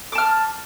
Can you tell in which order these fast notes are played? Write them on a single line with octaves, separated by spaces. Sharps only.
D6 A5 F6